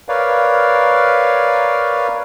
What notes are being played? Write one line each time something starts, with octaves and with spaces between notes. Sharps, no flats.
A#4 B4 C#5 D5 F5